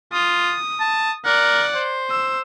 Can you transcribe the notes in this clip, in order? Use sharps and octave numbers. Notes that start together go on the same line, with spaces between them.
F4 D#6
A5
A#4 D5 F#5
C5
E6